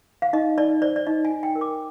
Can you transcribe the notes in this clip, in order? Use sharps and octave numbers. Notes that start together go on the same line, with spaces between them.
F5
D#4 D#5
D#4 D5
C5 D5
D5
D#4 D#5
G#5
D#4
G5
A#4
D6